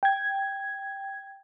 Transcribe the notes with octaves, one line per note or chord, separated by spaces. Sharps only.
G5 G#6